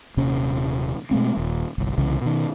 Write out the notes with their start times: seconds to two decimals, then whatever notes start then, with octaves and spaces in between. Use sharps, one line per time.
0.17 D#1 C3 A#3 C#4
1.11 B2 G#3 A3 C4
1.37 D#1
1.78 G1 C2
1.98 C2 C#3 E3
2.22 B2 D#3